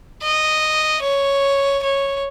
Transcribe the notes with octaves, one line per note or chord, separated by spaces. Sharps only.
D#5
C#5
C#5